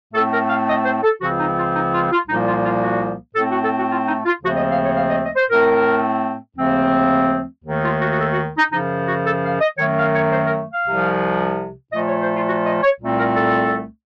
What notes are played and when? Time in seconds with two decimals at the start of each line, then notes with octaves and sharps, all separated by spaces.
0.14 A2 A3 C4 A4
0.32 A#4
0.50 F5
0.68 D#5
0.85 C5
1.03 A4
1.21 C#2 C#3 F3 C4 F#4
1.39 D#4
1.57 F4
1.75 D#4
1.93 F4
2.11 F4
2.28 C2 A#2 F3 A#3 D#4
2.47 F4
2.64 F4
2.82 F#4
3.35 A2 A3 C4 A4
3.50 F#4
3.63 A4
3.76 F#4
3.89 F4
4.07 D#4
4.26 F4
4.42 D#2 C#3 F3 A3 C4 F#4
4.56 D#5
4.70 F5
4.83 C#5
4.96 F5
5.09 D#5
5.23 D#5
5.36 C5
5.50 A2 A3 C4 A#4
6.57 D#2 C#3 F3 A3 C4
7.65 D#2 D#3 A3
7.83 F4
8.00 F#4
8.12 F#4
8.18 A4
8.31 F#4
8.58 D#4
8.71 F#2 C#3 F3 D#4
9.07 F#4
9.25 A4
9.44 F5
9.60 D#5
9.78 F#2 D#3 F#3 A3 C#5
9.97 F5
10.14 C#5
10.32 C5
10.46 A#4
10.72 F5
10.86 C2 C3 F3
11.93 A#2 F3 A3 D#5
12.07 C#5
12.20 C5
12.33 F4
12.47 F#4
12.64 D#5
12.83 C#5
13.00 C2 A#2 A3 C4
13.18 A#4
13.36 A4